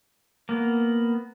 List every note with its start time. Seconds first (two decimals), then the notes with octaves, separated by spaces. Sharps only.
0.49 A#3 B3